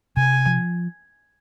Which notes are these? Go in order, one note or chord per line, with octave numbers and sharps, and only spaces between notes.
C3 G#5
F3